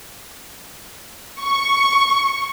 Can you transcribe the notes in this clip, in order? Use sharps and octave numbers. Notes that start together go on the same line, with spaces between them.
C#6